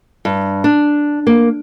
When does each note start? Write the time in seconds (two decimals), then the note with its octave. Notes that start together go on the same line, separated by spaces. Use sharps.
0.25 G2
0.64 D4
1.27 A#3